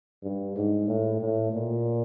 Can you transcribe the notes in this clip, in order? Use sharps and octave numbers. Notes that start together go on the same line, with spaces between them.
G2
G#2
A2
A2
A#2